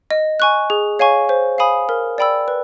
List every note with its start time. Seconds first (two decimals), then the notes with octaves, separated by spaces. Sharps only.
0.11 D#5
0.40 G#5 C#6 F#6
0.70 G#4
0.99 C#5 F5 G#5 C#6
1.29 C5
1.58 F5 G#5 B5 D#6
1.89 A#4
2.18 D5 G5 B5 E6
2.48 B4